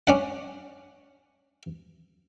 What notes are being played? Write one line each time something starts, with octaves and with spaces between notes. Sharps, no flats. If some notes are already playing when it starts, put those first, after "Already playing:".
C#4 D4 F#5